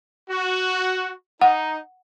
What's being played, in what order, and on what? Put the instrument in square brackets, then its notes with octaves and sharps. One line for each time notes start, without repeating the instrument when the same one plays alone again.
[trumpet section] F#4
[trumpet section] D#4 [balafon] F#5